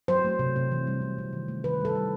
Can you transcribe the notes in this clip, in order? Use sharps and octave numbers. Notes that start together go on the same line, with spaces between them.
F#3 C5
A3
C3
C3
E3
G3
C3
C3
D#3
A3
D#3 B4
G3 A4
G3